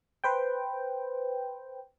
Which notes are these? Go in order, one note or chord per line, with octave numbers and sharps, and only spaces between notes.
B4 C5 G5